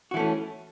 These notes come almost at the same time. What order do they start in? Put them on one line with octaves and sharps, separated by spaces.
F#4 E3 A3 C#4